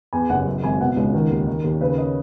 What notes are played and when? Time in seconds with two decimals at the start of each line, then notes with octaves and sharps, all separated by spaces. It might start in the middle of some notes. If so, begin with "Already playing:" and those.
0.13 E2 G#5
0.30 F#1 F#5
0.46 F#2
0.63 G#1 G#5
0.80 B2 F#5
0.97 C#2
1.13 D#3
1.30 D#2
1.47 D#3
1.64 D#2
1.81 C#3 B4
1.98 D#5